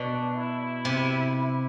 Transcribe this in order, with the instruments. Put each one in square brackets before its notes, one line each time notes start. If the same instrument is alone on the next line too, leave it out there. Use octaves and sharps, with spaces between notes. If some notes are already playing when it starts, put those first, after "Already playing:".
Already playing: [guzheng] B2 [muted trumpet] D4
[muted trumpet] E4
[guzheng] C3
[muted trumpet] E4